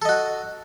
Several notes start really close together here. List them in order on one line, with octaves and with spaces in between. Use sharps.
A4 D#5 F#4